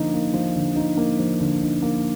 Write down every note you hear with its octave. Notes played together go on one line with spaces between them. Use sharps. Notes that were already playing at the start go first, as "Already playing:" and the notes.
Already playing: D3 F3 A#3 D#4
A#3
F3
D3
D#4
A#3
F3
D3
D#4
A#3